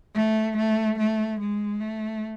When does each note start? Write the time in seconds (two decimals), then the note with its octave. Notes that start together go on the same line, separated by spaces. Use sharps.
0.15 A3
0.57 A3
0.98 A3
1.40 G#3
1.81 A3